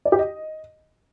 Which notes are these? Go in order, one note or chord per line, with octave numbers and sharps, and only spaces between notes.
D5
G4
D#5